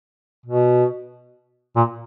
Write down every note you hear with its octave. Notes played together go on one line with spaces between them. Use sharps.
B2
A#2